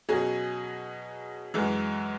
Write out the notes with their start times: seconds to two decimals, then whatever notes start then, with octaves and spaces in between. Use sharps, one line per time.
0.09 B2 F#3 C#4 G#4
1.54 F#2 E3 G#3